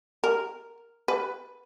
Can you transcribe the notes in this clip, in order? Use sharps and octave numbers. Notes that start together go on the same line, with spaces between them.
A#4
B4